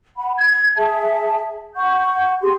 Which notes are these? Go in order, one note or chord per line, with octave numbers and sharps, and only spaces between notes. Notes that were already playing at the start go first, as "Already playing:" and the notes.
F#5 B5
G#6
G#4 E5 A5
F#5 C#6 G6
G4 G#4 C6